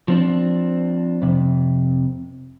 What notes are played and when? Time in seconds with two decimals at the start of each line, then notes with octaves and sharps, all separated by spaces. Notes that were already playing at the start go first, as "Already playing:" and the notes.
0.08 F3 C4 D4
1.22 F2 C3